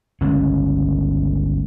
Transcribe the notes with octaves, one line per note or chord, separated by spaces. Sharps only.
G1 C#2 C#4